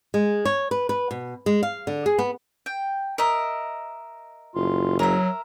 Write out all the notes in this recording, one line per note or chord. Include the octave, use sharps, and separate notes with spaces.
G#3
C#5
B4
B4
B2
G#3
F5
D3
G#4
B3
G5
A#4 D#5 E5
F#1 F4
F#3 A#4 E5